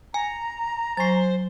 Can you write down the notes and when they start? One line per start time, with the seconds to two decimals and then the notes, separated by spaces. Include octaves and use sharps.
0.14 G#5 A#5
0.97 F#3 C5 G#5 C#6 A6 C7